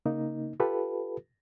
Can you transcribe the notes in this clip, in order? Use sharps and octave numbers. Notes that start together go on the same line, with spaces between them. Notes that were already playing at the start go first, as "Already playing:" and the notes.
C#3 A#3 D#4
F4 G4 A4 B4